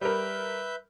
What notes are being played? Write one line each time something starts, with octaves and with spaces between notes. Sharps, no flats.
G3 A#4 B4 E5 G6